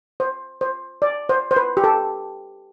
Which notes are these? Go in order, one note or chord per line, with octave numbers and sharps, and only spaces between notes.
C5
C5
D5
C5
C5
B4
G4
A4